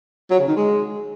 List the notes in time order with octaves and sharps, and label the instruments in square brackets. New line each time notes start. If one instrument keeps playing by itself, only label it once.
[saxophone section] F#3
C#3
D#3
G#3